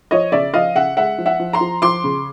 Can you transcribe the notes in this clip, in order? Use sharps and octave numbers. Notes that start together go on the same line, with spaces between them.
F3 C#5 D#5
C#3 D5 E5
F3 D#5 F5
C#3 E5 F#5
G#3 E5 F#5
F3
E5 F#5
F3
A#5 C6
F3
F3 C6 D6
C#3